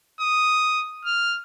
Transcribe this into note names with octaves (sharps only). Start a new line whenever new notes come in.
D#6
F6